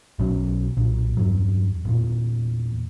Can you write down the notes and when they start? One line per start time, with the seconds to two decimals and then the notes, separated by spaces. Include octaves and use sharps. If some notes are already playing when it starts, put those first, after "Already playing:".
0.19 B1 B2 F#3 C#4
0.77 B1 A#2
1.17 E2 G2 F#3
1.85 E2 A#2